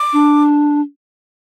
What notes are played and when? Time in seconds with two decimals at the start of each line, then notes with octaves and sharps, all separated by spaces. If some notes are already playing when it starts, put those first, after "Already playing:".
Already playing: D6
0.13 D4